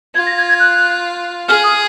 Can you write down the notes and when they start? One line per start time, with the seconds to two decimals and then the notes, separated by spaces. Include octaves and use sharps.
0.15 F4 G#6
0.26 A#6
0.38 G#6
0.49 G#6
0.60 F#6
1.48 G#4 F6
1.64 D#6